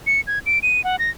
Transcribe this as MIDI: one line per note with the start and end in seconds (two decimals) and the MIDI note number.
0.07 0.21 97
0.27 0.39 92
0.46 0.59 98
0.63 0.84 99
0.84 0.99 78
0.99 1.10 94